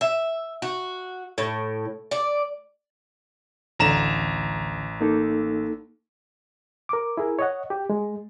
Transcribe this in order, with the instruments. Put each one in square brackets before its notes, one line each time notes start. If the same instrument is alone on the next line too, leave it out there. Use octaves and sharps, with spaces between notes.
[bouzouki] E5
F#4
A2
D5
[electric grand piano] A1 A#5 E7 [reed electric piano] D2 D3
[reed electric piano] A#3 D#4 A4
A#4 D6
E4 G#4 A#4
C#5 D#5 F#5
G4
G#3